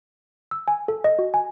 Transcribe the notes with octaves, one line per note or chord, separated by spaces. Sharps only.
E6
G#5
A4
D#5
F#4
G#5